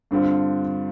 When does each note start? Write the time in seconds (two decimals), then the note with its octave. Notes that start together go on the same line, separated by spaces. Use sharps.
0.11 G2 D3 G3 C4 F4